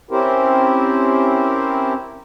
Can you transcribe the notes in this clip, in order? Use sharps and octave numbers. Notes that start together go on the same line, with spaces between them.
C4 C#4 E4 G4 A#4 C5